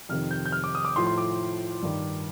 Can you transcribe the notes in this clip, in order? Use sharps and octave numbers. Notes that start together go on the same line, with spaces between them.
F2 C3 D#3 F6
G6
G6
F6
D6
D#6
D6
A2 F3 C6
C6
D6
G2 D#3